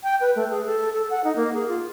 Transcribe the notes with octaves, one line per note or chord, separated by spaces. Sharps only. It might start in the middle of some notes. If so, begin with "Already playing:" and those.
G5
B4
A3
G#4
A4
A4
F#5
D#4
A#3
G#4
F4